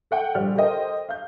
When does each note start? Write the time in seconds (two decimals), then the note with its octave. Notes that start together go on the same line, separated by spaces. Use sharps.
0.11 A4 F#5 G5
0.35 A#1 G3 F6
0.55 G4 A4 A#4 C5 D#5 G5
1.09 F5 G6